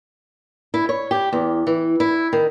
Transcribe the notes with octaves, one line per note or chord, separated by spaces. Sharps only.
E4
C#5
G4
E2
E3
E4
D#3